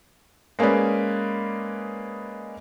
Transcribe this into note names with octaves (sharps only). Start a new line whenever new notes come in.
G#3 A#3 C#4 G#4 B4 D5